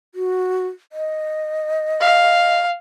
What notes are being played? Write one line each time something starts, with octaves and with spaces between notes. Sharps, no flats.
F#4
D#5
F5